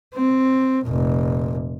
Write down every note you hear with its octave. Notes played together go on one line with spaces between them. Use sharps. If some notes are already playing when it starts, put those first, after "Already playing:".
C4
F1 A#2